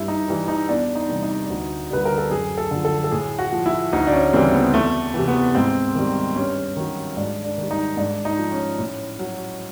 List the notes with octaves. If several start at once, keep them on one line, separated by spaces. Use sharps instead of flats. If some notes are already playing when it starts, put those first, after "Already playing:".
Already playing: G2 E4
D#4
E3 G3
D#4
E2 D4
D#4
C3 E3 G3
D#4
D2
D3 G3 B4
A#4
A4
F#2 G#4
A4
D3 F3
A4
A4
A2 G#4
F#4
F3
E4
D2 D#4
D4
C#4
C#3 E3 G3 C4
B3
E2 A3
C3 E3
B3
G#2 C4
D#3 G3
G2 C#4
D#3 F#3
G#2 D4
D4
D#3 G3
D#4
G#2 D4
D#4
F3
C#4
A2
F#3